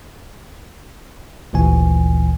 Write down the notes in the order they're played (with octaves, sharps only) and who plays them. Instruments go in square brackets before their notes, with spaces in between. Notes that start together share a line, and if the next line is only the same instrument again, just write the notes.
[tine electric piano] G#1 D2 A#2 E3 G#5